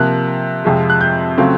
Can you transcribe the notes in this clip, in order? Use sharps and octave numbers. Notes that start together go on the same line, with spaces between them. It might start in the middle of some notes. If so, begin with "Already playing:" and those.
Already playing: C3 F3 A#3 F#6
F2 C3 F3 G#3
F#6
G6
C#3 F#3 A3 C4 F4